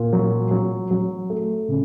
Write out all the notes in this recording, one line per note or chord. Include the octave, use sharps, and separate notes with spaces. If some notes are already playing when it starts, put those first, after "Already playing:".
Already playing: A#2
F#3
F#3
F#3
A3
C#3